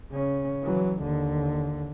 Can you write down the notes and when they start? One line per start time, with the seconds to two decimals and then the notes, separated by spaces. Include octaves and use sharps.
0.11 C#3 C#4
0.64 E3 F#3
1.02 D#2 D3